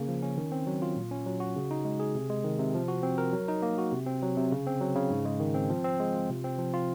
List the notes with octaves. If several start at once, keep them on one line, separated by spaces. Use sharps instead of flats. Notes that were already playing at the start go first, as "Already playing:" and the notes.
Already playing: C#3 A#3
F3
C#4
D#3
C4
F#3
F4
A#2
C#4
F#3
F#4
C#3
D#4
G#3
G#4
C3
G#3
D#3
C3
F3
F#4
C4
A#4
F#3
D#4
A#3
F#4
C3
C4
F#3
C3
C#3
C4
F#3
C#3
G#2
G#3
D#3
C4
F3
C4
G#3
F4
C3
C4
F3
F4